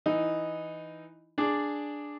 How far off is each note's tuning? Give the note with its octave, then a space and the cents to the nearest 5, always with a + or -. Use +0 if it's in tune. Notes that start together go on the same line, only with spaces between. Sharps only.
E3 +0 D#4 +0
D4 +0 G#4 +0 D5 +0